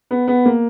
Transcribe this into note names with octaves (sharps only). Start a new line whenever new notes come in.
B3
B3
A#3